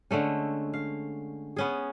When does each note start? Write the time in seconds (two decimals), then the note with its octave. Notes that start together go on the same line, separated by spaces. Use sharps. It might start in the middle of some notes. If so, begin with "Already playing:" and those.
0.11 D3 G#3 A3 C#4
0.73 F5
1.56 B3 C#4 G#4